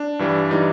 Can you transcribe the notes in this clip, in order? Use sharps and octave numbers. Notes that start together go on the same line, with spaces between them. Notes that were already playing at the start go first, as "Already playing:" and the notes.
Already playing: D4
G2 E3 G3
E3 G3 D#4